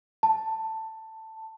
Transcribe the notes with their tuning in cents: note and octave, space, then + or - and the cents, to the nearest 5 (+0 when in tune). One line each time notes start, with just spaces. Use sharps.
A5 +10